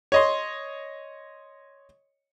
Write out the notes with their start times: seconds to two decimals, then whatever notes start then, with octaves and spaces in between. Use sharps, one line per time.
0.12 C#5 D#5 C6